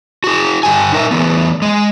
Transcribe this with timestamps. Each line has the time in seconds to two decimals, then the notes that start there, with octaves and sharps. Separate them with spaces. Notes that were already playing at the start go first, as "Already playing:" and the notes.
0.24 F#4 G#4
0.63 G2 G4 G#5
0.92 D#4 A#4 E5
1.11 E3 G3 A3 B3
1.62 G#3